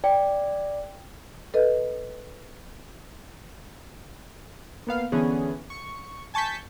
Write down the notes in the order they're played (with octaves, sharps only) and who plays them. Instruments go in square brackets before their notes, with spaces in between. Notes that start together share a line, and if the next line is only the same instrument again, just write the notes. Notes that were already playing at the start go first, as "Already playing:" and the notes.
[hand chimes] D5 [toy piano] G5
[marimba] A4 B4 D#5
[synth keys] A#3 B3 F5
D3 E3 B3 C#4 G#4
C#6
G#5 A5 C#6 G6 B6